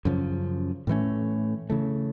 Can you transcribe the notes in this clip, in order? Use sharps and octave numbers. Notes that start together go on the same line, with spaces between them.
F#2 C#3 F3
A2 E3 A3 C#4
C#3 E3 A3